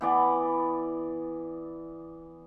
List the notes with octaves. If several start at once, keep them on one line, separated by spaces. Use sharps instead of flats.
E3 B3 D5